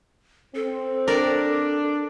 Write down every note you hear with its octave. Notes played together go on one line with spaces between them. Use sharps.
C4 A4
D4 A#4 D5